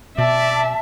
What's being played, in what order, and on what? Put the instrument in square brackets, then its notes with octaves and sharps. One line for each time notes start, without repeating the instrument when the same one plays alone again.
[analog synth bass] B2 [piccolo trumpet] D5 [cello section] E5 [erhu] A5